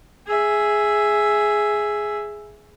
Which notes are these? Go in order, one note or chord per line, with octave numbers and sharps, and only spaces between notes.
G#4 E5